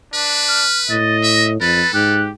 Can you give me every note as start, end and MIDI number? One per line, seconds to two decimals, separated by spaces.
0.14 0.67 62
0.14 0.97 71
0.48 0.79 89
0.90 1.60 45
0.90 1.52 75
0.90 1.17 93
1.23 1.47 76
1.23 1.46 94
1.61 1.83 41
1.61 2.19 69
1.61 1.90 71
1.61 1.92 93
1.94 2.30 44
1.94 2.31 67
1.94 2.22 90